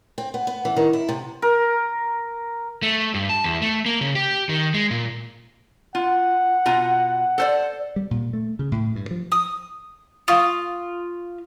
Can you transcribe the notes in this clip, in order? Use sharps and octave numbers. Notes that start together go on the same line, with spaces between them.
C4
B3
B3
E3
D#3
E4
C3
A#4
A3
G2
A5
E2
A3
A#3
C#3
G4
D#3
G#3
A#2
F4 F#5
B2 F4 A#5
A4 C5 D5
G3
A#2
A3
C#3
A2
G2
F3
D#6
F4 F5 C#6 D#6